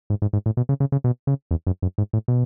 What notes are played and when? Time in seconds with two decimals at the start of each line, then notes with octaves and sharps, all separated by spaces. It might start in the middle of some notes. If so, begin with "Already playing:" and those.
0.10 G#2
0.22 G#2
0.33 G#2
0.46 A2
0.57 B2
0.69 C#3
0.80 C#3
0.92 C#3
1.04 B2
1.27 C#3
1.51 E2
1.67 F#2
1.82 F#2
1.98 G#2
2.13 A2
2.28 B2